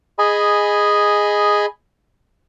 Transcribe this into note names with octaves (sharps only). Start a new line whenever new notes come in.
G#4 D#5 G#5 B5